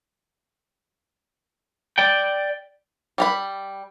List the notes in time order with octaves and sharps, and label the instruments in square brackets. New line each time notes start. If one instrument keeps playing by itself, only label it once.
[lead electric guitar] D5 G5
[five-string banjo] G3 A#5 B5